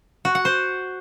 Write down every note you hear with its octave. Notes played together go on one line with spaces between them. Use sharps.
F#4
F#5
C5